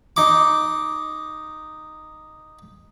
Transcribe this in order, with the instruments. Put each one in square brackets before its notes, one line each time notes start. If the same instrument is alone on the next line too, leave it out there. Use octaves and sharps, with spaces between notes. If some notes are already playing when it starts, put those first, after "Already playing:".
[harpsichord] D#4 D6